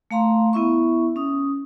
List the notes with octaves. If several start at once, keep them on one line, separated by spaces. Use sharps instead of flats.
A3 F5 A#5 C6
B3 E4 E5 C#6
C#4 D#6